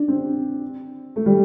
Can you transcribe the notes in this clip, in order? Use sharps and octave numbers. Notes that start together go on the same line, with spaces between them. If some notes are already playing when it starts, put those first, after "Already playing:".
Already playing: D4
C4
A3
G3